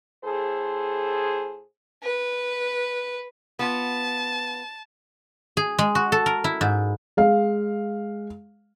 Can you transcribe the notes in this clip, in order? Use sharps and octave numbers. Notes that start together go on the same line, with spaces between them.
A2 G#4 A4 C5
B4
B3 F4 A5
G#4
G#3
F#4
A4
A#4
E4
G#2
G#3 F5